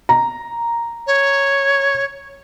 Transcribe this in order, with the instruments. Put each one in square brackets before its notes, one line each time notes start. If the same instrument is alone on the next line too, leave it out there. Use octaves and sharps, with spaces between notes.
[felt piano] A#5
[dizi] C#5